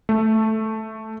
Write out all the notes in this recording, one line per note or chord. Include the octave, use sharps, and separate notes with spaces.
A3